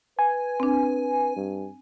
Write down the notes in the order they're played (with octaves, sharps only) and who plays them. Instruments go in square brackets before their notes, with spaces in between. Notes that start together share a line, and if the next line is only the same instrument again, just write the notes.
[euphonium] B4 [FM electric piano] G#5
[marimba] C4 D4
[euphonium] G2